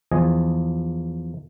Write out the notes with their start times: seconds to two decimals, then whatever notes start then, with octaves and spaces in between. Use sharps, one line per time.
0.12 E2 F3 D#5 G#5